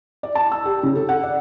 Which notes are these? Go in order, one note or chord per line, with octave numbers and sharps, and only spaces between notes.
D5
A5
E6
G4
C#3
A4
F#5
D5